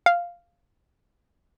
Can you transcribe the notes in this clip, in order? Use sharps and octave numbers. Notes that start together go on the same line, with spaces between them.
F5